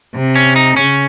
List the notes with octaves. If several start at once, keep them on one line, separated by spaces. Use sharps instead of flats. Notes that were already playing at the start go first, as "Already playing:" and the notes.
C3
C#4
D#4
C#3 C#4